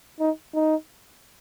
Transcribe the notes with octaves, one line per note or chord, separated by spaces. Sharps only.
D#4
D#4